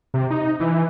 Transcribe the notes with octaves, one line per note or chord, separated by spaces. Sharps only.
C3
D#4
E3